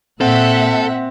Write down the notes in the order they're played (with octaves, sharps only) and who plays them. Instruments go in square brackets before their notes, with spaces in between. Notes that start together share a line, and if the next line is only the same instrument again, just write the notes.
[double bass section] A#2 [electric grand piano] C4 [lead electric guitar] A4 [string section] E5 F#5